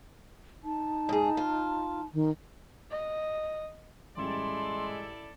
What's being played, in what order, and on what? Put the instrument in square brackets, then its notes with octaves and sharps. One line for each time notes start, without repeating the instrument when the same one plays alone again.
[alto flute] D#4 [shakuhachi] A5
[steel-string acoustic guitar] G#2 G#4
F4
[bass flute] D#3
[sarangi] D#5
[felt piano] A1 G3 [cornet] G#3 [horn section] E4 A4 D5 [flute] C6